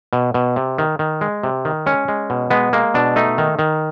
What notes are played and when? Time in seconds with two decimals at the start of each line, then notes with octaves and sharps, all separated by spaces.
0.13 B2
0.34 B2
0.56 C3
0.78 D#3
0.99 D#3
1.21 G#3
1.43 C3
1.65 D#3
1.86 G#3 C#4
2.08 G#3
2.30 B2
2.50 G#3 B3
2.73 G#3 A#3
2.94 B2 D4
3.16 A3 D#4
3.38 D#3
3.59 D#3